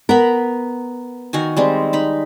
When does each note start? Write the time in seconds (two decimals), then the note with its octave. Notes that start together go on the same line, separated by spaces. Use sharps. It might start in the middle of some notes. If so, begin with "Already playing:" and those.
0.09 B3 A#4 A#5 B5
1.33 D#3 F#4 G#5
1.57 G3 G#3 C4
1.93 D#4 B5